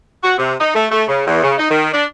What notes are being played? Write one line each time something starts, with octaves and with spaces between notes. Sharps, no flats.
F#4
C3
D#4
A3
A3
C#3
E2
C#3
D#4
D#3
D4